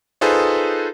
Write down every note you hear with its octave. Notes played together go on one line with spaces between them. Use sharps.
D#4 F4 G#4 A4 B4 C5